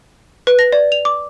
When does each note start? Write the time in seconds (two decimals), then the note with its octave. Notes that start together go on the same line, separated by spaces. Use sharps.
0.47 B4
0.59 A#6
0.72 D5
0.92 F7
1.05 D6